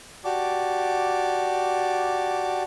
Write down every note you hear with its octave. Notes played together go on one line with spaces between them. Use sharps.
F#4 G4 D5 A5 D6